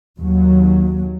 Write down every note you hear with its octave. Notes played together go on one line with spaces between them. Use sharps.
D#2 F#3